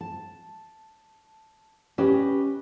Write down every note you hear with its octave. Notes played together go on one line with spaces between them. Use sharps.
A5
C#4 G4 B4 D#5